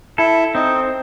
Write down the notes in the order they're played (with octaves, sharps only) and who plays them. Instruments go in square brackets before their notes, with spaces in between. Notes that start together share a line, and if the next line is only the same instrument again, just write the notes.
[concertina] E4 [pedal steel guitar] A4
[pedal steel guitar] C4 [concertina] D#4